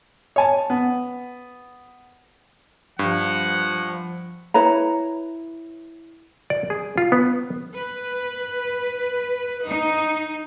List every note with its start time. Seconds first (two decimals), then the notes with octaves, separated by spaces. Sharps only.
0.36 C#5 G#5 A5
0.70 B3
2.99 G2 F3 F#5
4.54 E4 B4 C#5 A#5
6.50 D5
6.70 G#4
6.98 F4
7.12 B3
7.74 B4
9.66 D#4